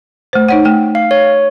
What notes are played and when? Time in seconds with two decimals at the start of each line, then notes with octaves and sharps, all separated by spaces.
0.33 A3 C5
0.49 D#4 C#5 F#5
0.65 A3 G5
0.95 F5
1.11 C#5